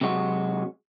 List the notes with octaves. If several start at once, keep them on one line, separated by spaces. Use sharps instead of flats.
C3 F#3 G#3 F#4